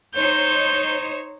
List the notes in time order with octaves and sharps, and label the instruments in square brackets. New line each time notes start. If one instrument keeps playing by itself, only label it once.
[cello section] D#4 C5 C#5 [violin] G6